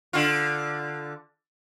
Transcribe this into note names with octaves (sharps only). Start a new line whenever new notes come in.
D3 F4